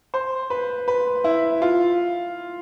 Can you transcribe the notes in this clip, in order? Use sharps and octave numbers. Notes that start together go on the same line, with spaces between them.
C5
B4
B4
E4
F4